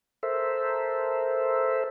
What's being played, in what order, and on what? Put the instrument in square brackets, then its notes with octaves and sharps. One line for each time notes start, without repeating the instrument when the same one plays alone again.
[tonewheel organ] A4 A#4 C5 E5